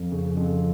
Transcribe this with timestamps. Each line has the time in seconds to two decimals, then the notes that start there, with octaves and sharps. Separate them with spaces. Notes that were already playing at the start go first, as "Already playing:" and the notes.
Already playing: F2
0.12 C#3
0.37 F2